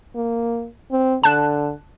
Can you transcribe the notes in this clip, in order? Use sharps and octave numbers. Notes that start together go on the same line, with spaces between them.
A#3
C4
D3 A5 F#6